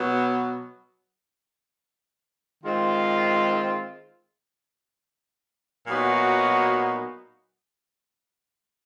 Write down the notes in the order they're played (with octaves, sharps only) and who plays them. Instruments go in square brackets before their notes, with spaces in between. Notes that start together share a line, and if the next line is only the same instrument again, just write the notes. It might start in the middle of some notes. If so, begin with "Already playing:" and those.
Already playing: [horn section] B2 F#3 B3
D#3 G#3 C4 F4
A#2 F#3 B3 D#4 F#4